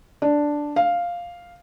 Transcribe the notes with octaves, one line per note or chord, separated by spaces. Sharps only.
D4
F5